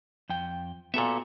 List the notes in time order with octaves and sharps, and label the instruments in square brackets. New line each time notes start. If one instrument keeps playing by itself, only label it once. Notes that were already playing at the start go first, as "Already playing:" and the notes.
[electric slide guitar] F2 G5
[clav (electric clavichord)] A#2 E5 [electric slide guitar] B3 F#4 A4